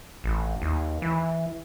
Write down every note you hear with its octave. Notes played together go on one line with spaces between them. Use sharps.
A1
D#2
E3